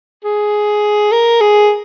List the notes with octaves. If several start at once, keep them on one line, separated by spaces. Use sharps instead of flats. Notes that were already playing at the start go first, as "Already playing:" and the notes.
G#4
A#4
G#4